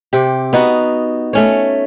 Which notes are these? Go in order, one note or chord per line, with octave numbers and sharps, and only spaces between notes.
C3 G4
B3 D#4 F#4
A3 C#4 C#5